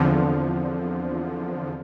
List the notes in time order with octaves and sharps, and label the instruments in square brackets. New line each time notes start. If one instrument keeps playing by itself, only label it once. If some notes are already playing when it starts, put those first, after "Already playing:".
Already playing: [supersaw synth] E2 D3 F3 [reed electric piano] C4